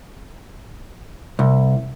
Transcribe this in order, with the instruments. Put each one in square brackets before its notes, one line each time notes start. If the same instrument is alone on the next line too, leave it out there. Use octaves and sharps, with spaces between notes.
[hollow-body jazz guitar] C2